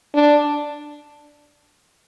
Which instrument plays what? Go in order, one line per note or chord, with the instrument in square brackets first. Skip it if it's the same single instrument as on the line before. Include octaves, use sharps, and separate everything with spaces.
[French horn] D4